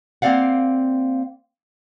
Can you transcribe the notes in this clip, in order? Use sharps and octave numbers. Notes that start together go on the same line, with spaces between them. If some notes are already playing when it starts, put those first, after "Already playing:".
A#3 C4 D5 F5 F#5